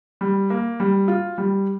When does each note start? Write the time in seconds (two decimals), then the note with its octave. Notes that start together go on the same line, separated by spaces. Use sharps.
0.21 G3
0.50 A#3
0.80 G3
1.08 F4
1.38 G3